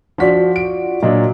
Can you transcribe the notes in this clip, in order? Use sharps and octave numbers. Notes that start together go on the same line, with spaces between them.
F3 F4 F#4 D5 B6
D7
A#2 F#3 D4 D#5